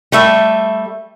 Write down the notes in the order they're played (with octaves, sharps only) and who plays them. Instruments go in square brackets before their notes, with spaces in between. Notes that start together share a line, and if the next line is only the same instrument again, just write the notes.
[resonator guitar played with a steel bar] G3 A3 E5